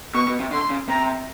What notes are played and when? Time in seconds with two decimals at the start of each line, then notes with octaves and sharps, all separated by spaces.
0.15 B2 C#6
0.28 B2
0.40 C3
0.51 D3 C6
0.70 C#3
0.89 C3 A#5